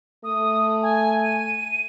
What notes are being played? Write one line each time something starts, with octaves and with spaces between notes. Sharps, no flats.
A3 D#6
G#5
D#7